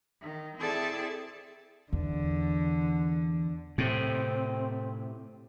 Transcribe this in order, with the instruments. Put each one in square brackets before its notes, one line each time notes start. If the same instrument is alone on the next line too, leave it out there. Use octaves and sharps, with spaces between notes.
[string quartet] D#3
C4 E4 G#4 A4 D5 A5
[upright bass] E2 [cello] D3
[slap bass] A2 C3 [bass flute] C4